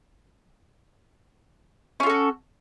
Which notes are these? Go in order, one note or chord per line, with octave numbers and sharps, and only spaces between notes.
C#4 F4 F#4 A4